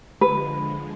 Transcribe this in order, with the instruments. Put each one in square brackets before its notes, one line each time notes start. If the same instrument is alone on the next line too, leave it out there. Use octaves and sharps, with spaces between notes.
[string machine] D3 F3 G#3 [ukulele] B4